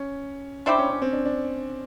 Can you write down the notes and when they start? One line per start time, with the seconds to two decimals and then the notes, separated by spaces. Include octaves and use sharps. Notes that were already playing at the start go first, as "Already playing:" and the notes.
Already playing: C#4
0.66 G3 C4 D4 E4 G4
0.78 C#4
0.90 C#4
1.02 C4
1.13 D4
1.26 D4